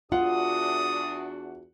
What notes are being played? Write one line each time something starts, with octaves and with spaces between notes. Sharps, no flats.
E2 D4 F4 F#4 F#5 D#6